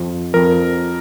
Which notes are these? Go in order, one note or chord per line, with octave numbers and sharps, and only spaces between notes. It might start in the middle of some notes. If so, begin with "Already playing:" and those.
Already playing: F2 F3
F2 F3 A#4